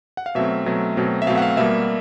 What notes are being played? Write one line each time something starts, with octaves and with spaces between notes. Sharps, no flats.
F#5
F5
B2 F#3 A3 C4 E5
B2 F#3 A3 C4
B2 F#3 A3 C4
E5
B2 F#3 A3 C4 F5
F#5
F5
B2 G3 A#3 E5